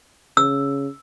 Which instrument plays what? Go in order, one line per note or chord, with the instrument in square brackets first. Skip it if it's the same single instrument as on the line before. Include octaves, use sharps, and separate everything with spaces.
[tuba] C#3 [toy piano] E6